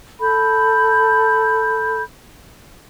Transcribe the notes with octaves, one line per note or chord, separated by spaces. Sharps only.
A4 B5 G6